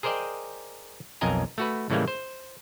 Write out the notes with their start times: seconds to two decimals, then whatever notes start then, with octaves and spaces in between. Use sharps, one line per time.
0.03 G#4 A#4 C5 D5 D#5 G5
1.21 B1 F2 A#4 D#5 G#5 A#5
1.58 A3 F#4 B4
1.90 A2 C#3 E3 G3 G#3 A#3
2.08 C5